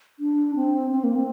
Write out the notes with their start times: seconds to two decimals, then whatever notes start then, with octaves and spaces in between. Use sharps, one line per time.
0.19 D4
0.56 C4
0.91 C4
1.04 A#3
1.15 C4